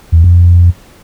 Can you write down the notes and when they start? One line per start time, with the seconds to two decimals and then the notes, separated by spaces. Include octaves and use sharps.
0.12 E2
0.24 F2